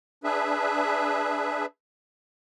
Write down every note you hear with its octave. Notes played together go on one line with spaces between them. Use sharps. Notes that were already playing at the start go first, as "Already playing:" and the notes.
D4 G#4 B4 E5